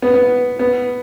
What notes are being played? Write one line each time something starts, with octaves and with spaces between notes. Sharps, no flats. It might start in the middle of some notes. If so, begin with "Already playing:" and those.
B3
B3
B3